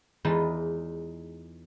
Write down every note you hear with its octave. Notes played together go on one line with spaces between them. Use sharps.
E2 E3 G#3 D#4 F4 A5